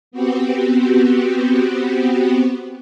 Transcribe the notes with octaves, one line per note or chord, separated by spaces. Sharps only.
B3 C4 F#4 G4